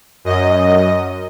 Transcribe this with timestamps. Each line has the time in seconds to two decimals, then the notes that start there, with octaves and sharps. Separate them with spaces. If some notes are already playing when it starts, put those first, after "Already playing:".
0.24 F#2 D#5